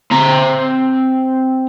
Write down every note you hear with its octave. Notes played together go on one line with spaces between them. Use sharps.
C4 A#5